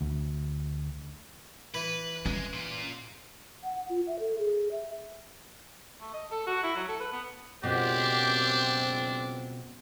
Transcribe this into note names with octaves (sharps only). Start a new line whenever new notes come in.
D2
E3 B4
G#3 C#4
A#2 F4
F#5
F4
E5
A4
G#4
E5
A3
D#5
A4
F#4
E4
F#3
A4
B4
B3
C#2 F#2 B2 C4 D4 G4